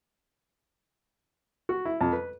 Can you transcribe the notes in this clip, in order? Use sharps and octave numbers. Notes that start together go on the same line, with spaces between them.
F#4
E4
F2
B4